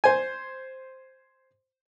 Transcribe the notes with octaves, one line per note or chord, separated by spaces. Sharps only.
C5 G#5